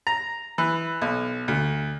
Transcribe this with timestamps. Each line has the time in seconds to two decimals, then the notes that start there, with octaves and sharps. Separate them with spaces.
0.07 A#5
0.58 E3
1.02 B1
1.48 D2